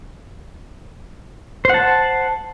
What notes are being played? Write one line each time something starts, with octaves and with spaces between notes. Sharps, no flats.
C5 F#5 A5